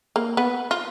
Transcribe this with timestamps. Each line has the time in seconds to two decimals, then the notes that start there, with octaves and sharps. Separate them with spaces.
0.16 A#3
0.37 B3
0.71 F4